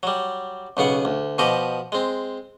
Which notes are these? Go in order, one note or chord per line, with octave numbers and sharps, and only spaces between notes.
F#3 G3
B1 C#3 B3 F#5
D2
B2 F3 G4 D#5 B5
G#3 C4